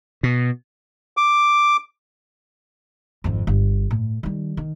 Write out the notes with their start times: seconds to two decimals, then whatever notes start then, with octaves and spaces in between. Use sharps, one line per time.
0.23 B2
1.17 D6
3.24 G#1 F2
3.47 G1
3.91 A2
4.23 D#3 G3
4.57 D#3